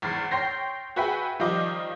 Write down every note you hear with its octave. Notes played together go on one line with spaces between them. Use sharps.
G#1 E2 F6 A6 C7
C#5 G5 C6 G6 A#6 C7
F#4 G#4 B4 E5 G5 G#5
D#3 F3 G3 F4 D#5 D6